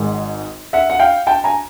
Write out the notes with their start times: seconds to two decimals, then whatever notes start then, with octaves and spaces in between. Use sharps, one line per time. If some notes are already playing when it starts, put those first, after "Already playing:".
Already playing: G#1 G#2 D#3 G#3
0.73 E5 F#5
0.90 F#5
1.00 F5 G5
1.27 G5 A5
1.44 G#5 A#5